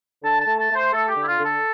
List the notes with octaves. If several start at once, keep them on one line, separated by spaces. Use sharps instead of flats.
D3 A5
A5
A3
A5
A3
C5
A3 A4
G4
D3
E4
F4
D3
A4